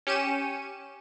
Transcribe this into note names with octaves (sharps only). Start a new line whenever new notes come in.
C#4 G4 C#7 D#7 E7